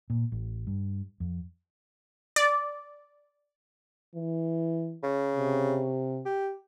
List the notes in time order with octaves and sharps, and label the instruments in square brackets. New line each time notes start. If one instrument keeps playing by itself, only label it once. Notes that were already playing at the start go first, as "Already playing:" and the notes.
[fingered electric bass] A#2
A1
G2
F2
[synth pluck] D5
[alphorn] E3
[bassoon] C#3
[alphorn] C3
[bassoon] G4